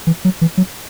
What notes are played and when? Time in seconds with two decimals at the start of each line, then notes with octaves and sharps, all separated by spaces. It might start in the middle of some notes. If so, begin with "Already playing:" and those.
0.07 E3
0.25 F#3
0.41 E3
0.57 F#3